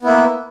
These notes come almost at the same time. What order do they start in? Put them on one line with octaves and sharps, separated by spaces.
B3 E4 A#3